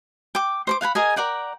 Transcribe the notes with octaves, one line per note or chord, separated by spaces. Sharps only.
G5 D6
C5 C#6 D6
F5 F#5 G#5 B5
G#4 A#4 D#5 G#5
A#4 D5 F#5 G5